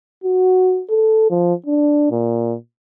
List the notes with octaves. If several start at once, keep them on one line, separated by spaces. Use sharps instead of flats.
F#4
A4
F3
D4
A#2